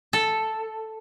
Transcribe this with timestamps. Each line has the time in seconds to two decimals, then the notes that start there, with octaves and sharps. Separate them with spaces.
0.13 A4